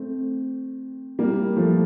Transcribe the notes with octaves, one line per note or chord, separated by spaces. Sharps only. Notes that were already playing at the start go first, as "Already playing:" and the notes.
Already playing: A3 C4
G3 A#3
F3 A3